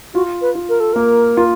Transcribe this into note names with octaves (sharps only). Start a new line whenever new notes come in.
F4 F#4
B4
F4
A#4
A4
A#3 A#4
F4